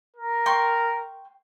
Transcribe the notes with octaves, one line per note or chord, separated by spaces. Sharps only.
A#4
G5 C6 C#6